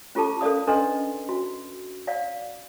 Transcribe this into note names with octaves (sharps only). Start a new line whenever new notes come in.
C#4 F4 G4 A4 A5 D6
C#4 A4 A#4 D5 F5 D#6
C#4 D4 A4 B4 D#5 C6
F#4
D5 F5 F#5